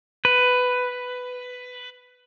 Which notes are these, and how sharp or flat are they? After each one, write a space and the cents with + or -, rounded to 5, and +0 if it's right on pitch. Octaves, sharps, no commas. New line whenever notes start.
B4 +10